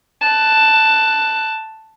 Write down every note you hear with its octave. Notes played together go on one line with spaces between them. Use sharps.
A5 F#6